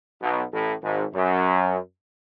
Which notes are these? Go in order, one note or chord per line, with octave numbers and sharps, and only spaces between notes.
B1 B2
A1 A2
G#1 G#2
F#2